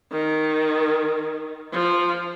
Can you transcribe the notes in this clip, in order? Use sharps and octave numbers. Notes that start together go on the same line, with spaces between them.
D#3
F3